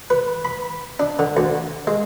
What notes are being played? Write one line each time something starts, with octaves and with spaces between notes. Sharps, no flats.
B4
B5
D4
D3
D2
G#3